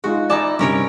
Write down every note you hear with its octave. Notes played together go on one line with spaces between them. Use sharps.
G#3 D#4 F4 F#4
D#4 E4 D5 G#5 A5 D6
G2 C3 C#4 A#4 C#5 D7